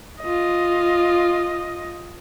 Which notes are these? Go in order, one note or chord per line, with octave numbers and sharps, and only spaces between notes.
F4 D#5